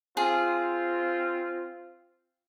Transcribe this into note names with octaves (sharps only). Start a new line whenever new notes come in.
C4 F4 G#4